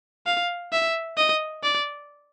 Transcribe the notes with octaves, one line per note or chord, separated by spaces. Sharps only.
F5
E5
D#5
D5